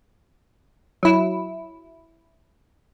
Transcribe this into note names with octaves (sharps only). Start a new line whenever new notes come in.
F#3 E4